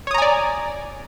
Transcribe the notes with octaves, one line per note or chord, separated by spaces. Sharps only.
C#5 D5 G#5 A#5 D#6